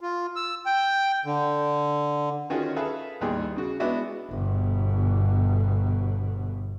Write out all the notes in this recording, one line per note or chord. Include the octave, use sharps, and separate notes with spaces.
F4
E6
G5
D3
D#3 C#4 F4 F#4 G#4
G#4 A4 B4 E5 F5
A1 D#2 G3 G#4
C#3 F#4
G#3 B3 D4 E4 F#4 E5
G1 B2